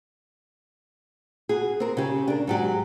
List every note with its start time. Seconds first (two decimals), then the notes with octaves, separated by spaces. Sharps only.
1.49 F#4 G#4
1.80 C4 A#4
1.97 C#3 G4
2.28 D4 A#4
2.47 G#2 F#3 G4